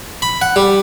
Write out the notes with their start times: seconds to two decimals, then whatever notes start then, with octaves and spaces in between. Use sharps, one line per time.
0.22 B5
0.42 F#5
0.56 G3